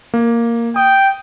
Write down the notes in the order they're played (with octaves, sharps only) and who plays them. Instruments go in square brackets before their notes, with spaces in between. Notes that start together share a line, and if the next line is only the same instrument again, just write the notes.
[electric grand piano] A#3
[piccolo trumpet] G5 [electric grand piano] D#6